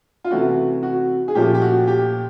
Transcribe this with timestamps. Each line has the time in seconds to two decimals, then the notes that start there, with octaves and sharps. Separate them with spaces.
0.24 F4
0.31 C3 E3 A3 C#4 F#4
0.83 F#4
1.28 G#4
1.35 A#2 F3 A3 C#4 G4
1.54 G4
1.62 F#4
1.88 G4